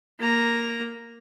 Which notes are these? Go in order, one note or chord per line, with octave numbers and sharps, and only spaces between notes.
A#3 A#5